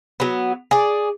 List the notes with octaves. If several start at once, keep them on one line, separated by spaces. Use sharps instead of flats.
F#3 B3
G#4 D5